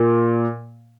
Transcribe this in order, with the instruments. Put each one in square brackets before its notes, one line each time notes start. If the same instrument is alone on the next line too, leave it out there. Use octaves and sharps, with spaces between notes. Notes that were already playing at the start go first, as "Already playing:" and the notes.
Already playing: [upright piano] A#2